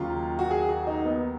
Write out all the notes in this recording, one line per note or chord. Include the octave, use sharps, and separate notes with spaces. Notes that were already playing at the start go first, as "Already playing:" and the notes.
Already playing: D#2 C#3 F#3 F4
F#4
G#4
F#4
D#4
B3